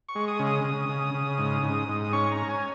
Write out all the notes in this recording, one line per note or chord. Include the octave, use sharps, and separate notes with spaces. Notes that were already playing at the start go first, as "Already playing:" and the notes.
C#6
G#3
D#6
C#3
D#6
C#3
C#3
C#3
G#2
G#2
G#2
D#6
C#4 C#6
A#5
C#4
G#5